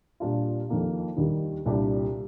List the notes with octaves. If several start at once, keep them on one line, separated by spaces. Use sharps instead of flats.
A#2 G3 D4 F4
F2 D#3 A#3 F4
D#2 D#3 G3
C2 A#2 G3 D4 G4